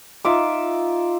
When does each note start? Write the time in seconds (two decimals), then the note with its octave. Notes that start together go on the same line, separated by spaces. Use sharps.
0.25 D#4 F4 E5 D6